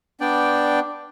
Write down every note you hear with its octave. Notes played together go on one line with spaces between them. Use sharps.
B3 D4 D5 G5